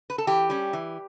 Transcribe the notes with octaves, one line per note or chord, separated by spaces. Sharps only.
B4
A4
E3 G4
G3 C#4
E3